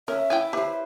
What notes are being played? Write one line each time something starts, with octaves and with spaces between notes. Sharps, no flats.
C#4 A#4 E5
E4 G5 G#5 D6
G4 B4 C5